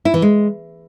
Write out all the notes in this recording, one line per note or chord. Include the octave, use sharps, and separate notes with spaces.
E4
E3
G#3